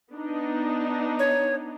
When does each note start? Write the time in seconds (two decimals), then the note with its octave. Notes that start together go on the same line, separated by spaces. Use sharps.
0.12 B3 D4 D#4
1.19 C#5